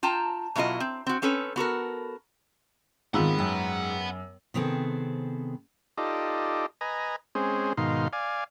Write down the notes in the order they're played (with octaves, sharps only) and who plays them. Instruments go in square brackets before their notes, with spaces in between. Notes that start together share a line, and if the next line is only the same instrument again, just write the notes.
[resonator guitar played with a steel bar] F4 G5 A5 A#5
B2 F#3 E4 F4 A#4 D#5
C4
C4 F#4
C4 C#4 A4 B4 C#5
B3 F#4 A4 A#4
[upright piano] G#2 [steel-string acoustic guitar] D#3 B3 C4 [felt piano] F4 E6 [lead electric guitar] F#5 B5
[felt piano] F#2 [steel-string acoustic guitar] G5
[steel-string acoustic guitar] C3 D#3 B3 C4 G#4 A4
[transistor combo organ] D#4 F4 G4 A4 D5 D#5
B4 D#5 G#5 A#5
G#3 C4 C#4 G#4 C5
G#2 B2 D#3 D#4 F5 C6
D5 F5 G#5